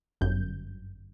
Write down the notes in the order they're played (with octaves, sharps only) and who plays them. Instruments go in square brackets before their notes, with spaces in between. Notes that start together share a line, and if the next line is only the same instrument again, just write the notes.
[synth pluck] G1 F#2 G6